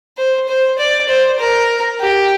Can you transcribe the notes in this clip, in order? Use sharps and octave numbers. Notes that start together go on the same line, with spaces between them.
C5
C5
D5
C5
A#4
G4